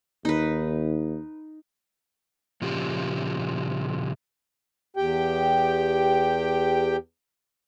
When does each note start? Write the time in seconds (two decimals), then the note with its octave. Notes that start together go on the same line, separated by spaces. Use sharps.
0.25 D#2 D#4 B4
2.61 A#2 C#3 F3 G4
4.97 E2 G4 G5